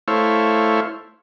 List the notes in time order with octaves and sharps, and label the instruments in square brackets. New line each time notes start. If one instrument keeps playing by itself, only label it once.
[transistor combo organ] A3 E4 C5 C#5 F5